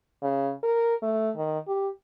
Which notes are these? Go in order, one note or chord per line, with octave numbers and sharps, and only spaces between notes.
C#3
A#4
A3
D#3
G4